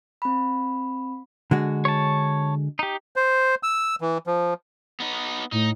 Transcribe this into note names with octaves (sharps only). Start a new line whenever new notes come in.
C4 B5
D3 G#3 F#4
C#5 A5
D#4 G4
C5
E6
E3
F3
B3 D#4
A2 D#4